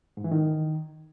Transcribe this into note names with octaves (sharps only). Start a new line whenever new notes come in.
G#2
E3
D#3